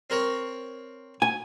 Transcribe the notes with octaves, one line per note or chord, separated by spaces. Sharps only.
C4 A#4 C#5
G#5